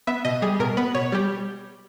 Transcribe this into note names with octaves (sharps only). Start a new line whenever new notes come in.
B3 E5
B2 D#5
G3 G#4
B2 A#4
B3 B4
B2 C#5
G3 G4